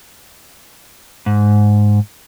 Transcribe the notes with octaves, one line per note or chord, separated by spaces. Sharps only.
G#2